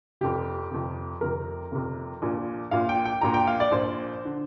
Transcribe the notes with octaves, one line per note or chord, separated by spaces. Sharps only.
F1 F2 C3 G4
F1 F2 C3
F1 F2 C3 A#4
F1 F2 C3
A#1 A#2
A#1 A#2 F5
G5
G5
A#1 A#2 A#5
G5
F5
D5
A#1 A#2 C5
D3